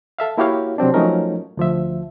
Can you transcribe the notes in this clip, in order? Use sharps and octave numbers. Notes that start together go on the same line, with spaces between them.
A4 E5 F5
A#3 E4 F#4 G4 C#5 F5
C3 F#3 C4 D4
F3 F#3 A3 C#4 D#4 A#4
D2 F3 E5